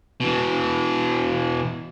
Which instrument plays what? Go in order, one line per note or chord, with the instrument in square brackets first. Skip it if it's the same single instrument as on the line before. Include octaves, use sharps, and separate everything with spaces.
[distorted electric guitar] B2 E3